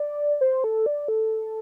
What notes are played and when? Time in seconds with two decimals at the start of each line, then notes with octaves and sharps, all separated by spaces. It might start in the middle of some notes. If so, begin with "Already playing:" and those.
Already playing: D5
0.41 C5
0.64 A4
0.86 D5
1.08 A4